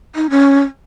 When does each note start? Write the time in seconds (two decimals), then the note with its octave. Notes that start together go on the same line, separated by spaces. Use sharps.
0.15 D#4
0.30 C#4